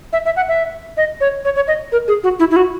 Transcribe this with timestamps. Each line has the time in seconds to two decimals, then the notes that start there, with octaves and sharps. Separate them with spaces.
0.13 E5
0.25 E5
0.36 F#5
0.48 E5
0.97 D#5
1.20 C#5
1.45 C#5
1.55 C#5
1.67 D#5
1.92 A#4
2.08 G#4
2.23 F#4
2.39 E4
2.51 E4
2.56 F#4